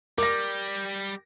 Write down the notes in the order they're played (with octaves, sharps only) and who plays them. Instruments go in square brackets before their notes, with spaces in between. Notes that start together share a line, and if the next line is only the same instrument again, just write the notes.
[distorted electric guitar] G3 [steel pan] A#4 [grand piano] D6 A#6